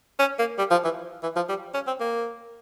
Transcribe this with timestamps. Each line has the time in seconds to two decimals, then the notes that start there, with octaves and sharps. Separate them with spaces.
0.19 C#4
0.39 A#3
0.58 G3
0.71 F3
0.84 E3
1.23 E3
1.36 F3
1.49 G3
1.74 C#4
1.87 C4
2.00 A#3